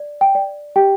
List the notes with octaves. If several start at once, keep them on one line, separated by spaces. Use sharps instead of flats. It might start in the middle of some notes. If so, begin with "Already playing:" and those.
Already playing: D5
G5
D5
G4 G5